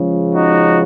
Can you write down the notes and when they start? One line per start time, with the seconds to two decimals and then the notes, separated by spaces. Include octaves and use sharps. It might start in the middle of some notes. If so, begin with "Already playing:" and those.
Already playing: C#2 C#3 F3
0.33 D#4 F#4